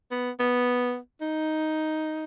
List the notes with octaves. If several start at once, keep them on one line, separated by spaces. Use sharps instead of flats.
B3
B3
D#4